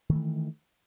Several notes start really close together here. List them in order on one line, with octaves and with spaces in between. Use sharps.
D#3 A3 E3